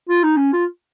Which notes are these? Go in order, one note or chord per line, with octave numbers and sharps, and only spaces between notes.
F4
D#4
C#4
F4